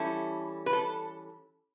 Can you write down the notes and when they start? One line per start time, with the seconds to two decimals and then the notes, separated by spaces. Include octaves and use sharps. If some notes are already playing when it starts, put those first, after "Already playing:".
Already playing: E3 G3 C#4 E4 A4
0.66 B4
0.73 A4